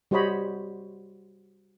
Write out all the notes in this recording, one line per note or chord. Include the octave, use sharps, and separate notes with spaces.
G3 F#4 C5 C#5 D#5 B5